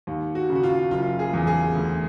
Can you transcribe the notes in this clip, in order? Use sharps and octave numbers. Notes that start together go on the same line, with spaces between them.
D#2
F#4
C#3
F#4
F4
F#1 F4
G#4
E2
G#4
D2